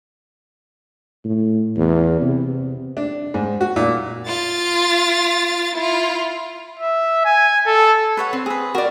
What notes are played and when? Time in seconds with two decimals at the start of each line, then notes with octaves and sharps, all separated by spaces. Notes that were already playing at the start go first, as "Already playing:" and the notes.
1.25 A2
1.77 E2
2.22 C3
2.97 D4
3.34 G#2
3.61 F#4
3.76 A#2
4.27 F4 A6
5.75 E4 F4
6.79 E5
7.25 G#5
7.66 A4
8.17 B4 C#5 F#5
8.33 C4
8.46 G#4 B4
8.75 F#4 A#4 D5